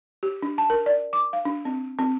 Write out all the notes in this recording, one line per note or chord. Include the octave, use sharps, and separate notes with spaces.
G4
D4
A5
A#4
D5
D6
F5
D4
C4
C4